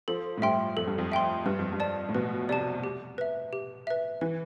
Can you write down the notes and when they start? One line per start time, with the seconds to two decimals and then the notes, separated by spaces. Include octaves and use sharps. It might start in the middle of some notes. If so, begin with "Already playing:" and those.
0.08 F3 A4
0.38 A2
0.42 G2 E5 G5 C6
0.77 F2 A4
0.88 G2
0.98 F2
1.12 E5 G5 C6
1.46 G2 B4
1.59 F2
1.73 G2
1.80 D5 A5
2.09 A2
2.15 B2 B4
2.49 C3 D5 A5
2.84 G4
3.18 B4 E5
3.53 G4
3.87 B4 E5
4.21 E3 B4